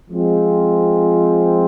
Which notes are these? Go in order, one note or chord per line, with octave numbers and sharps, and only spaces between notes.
F3 G#3 C4 F4